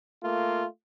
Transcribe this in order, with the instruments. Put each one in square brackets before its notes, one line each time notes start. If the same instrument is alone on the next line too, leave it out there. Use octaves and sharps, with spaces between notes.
[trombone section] A3 A#3 F4